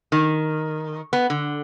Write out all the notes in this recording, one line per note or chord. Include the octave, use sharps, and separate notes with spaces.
D#3
B3
D3